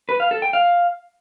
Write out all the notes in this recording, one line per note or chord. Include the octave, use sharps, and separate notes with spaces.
B4
F5
A4
G5
F5